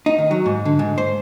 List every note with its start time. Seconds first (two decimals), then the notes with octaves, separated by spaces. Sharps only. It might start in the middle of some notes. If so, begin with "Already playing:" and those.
0.06 D#4
0.18 D#3
0.31 F#3
0.46 G#2
0.65 D3
0.79 G#2
0.98 C5